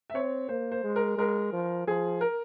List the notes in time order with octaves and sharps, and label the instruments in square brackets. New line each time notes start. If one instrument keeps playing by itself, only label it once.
[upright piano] E5
[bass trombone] C4 [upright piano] C#5
[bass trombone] A#3 [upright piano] C5
[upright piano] C5
[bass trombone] G#3
[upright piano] A#4
[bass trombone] G#3 [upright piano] A#4
[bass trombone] F3
[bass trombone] F3 [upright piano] G#4
[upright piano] A#4